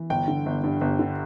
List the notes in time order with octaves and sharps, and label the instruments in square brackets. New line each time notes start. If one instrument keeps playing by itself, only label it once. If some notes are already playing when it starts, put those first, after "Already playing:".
Already playing: [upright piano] E3
G1 G5
D3
G1
G2
G1
D3